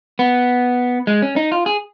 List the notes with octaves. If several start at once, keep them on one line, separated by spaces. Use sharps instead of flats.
B3
G#3
C#4
D#4
F4
G#4